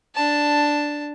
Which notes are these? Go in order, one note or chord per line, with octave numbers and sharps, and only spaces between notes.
D4 A5